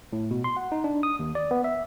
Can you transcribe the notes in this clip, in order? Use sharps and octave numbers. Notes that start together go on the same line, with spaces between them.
A2
B2
C6
F#5
D#4
D4
D#6
D#2
D5
B3
E5